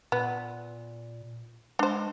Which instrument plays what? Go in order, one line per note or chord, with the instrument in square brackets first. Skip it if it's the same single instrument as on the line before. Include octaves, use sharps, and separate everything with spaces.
[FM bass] A#2 [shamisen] B3
[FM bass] G#3 [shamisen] D4 C5